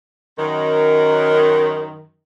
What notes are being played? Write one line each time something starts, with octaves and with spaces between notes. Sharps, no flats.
F#2 D#3